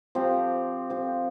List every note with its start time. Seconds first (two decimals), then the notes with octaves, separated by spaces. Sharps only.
0.15 F3 C4 G4
0.90 F3 C4 G4